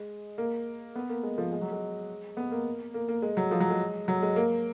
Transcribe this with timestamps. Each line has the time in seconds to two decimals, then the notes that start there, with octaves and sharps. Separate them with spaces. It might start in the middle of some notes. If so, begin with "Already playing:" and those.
Already playing: G#3
0.38 A#3
0.95 B3
1.10 A#3
1.23 G#3
1.38 F3
1.52 G#3
1.61 F#3
1.72 G#3
2.37 B3
2.52 A#3
2.94 A#3
3.08 A#3
3.22 G#3
3.37 F#3
3.51 F3
3.60 F#3
3.70 G#3
4.08 F#3
4.22 G#3
4.36 A#3